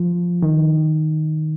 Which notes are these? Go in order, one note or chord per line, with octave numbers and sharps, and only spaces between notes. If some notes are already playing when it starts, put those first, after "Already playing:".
Already playing: F3
D#3